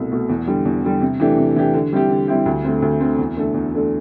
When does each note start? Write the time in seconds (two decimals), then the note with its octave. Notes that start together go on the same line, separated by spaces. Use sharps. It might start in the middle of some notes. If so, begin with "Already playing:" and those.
Already playing: C2 B2 A3
0.11 B2 A3
0.29 E2
0.47 D3 G3
0.65 E2
0.84 D3 G3
1.01 C3
1.20 E3 A3 D4 G4
1.37 C3
1.56 E3 A3 D4 G4
1.74 D3
1.93 G3 C4 E4 G4
2.10 D3
2.28 G3 C4 E4 G4
2.46 D2
2.64 D3 A3 C4
2.82 D2
3.00 D3 A3 C4
3.18 E2
3.37 D3 A3 D4 A4
3.54 E2
3.74 D3 A3 D4 A4